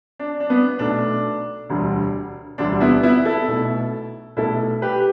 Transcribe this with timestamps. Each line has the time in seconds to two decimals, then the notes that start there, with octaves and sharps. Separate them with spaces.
0.19 D4
0.40 D4
0.50 B3
0.79 B1 B2 A3 D4
1.69 E1 D2 D3 G3
2.58 E1 D2 D3 G3 D4
2.81 B3 E4
3.03 B3 E4
3.25 E4 A4
3.48 B1 B2 A3
4.37 B1 B2 A3 E4 A4
4.82 G4 B4